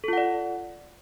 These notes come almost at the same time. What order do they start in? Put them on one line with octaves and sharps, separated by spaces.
A4 F4 F#5 D5